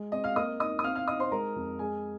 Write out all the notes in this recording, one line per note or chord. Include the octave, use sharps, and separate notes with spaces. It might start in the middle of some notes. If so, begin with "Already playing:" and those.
Already playing: G#3
C4 D#5
F5 F6
A#3 D#5 D#6
D#4 D#5 D#6
D#6
C4 F5 F6
F5 F6
D#4 D#5 D#6
C5 C6
G#3 A#4 A#5
F2
G#3 G#4 G#5